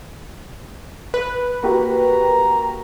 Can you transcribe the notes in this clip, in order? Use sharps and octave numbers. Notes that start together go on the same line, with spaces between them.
B4
A#3 F#4 G4 A#5